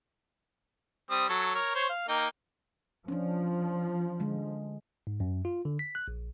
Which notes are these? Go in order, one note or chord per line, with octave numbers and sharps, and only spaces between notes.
G3 C4 D#6
F#3 A4 C#5
A#4 C#5
C5 C#5
F5
A#3 D#4 G5
F3 C#4 D4
D3 G#3
G#2
F#2
F4
D3
B6
F#6
A#1